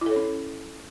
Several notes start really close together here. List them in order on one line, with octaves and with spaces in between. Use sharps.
E4 A4 C#5 C#4